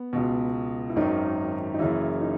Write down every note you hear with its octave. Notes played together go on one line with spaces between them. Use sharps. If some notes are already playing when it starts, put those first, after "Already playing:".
Already playing: B3
C#2 B2
E4
G#1 F#2 D#3 D#4
D#4
F#1 F#2 C#3 E3 E4
D#4